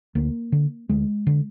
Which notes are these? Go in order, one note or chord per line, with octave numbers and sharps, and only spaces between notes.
D2 A#3
D3
D2 G#3
D3